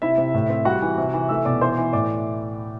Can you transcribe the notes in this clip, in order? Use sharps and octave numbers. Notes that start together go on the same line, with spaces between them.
C3 E4 E5
C3
A2
C4
G3 F#4 F#5
E3
C3
E3
A3 E5 E6
B2 D5 D6
E3 C5 C6
E3
A2 D5 D6